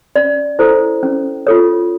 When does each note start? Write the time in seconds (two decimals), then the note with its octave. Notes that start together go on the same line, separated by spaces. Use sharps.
0.16 C#4 D5
0.59 E4 A4 C5
1.03 C#4
1.47 F4 A4 C#5